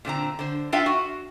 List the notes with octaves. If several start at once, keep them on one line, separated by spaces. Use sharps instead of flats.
A#2 D3 C4 A#5
D3 C5
D4 F4 A4 E5 F5 G5
F#4